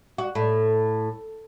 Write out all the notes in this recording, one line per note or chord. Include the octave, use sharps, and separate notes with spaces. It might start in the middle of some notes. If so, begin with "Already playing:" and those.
F#4
A2